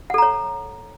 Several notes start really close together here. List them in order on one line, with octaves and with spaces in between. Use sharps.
F#5 A4 A#5 C#5